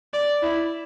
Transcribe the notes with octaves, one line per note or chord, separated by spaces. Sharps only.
D5
E4